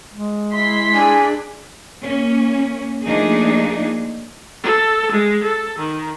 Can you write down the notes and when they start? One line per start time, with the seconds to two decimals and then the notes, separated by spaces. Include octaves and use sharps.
0.12 G#3
0.52 E4 C6 B6
0.95 D4 G#4 G#5
2.02 A#3 C#4
3.05 F3 A3 A#3 D4 D#4 G#4
4.63 A4
5.12 G#3
5.43 A4
5.78 D#3